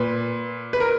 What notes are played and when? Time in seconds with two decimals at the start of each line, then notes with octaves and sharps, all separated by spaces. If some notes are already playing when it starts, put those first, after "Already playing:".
Already playing: A#2 B4
0.73 B4
0.80 A#4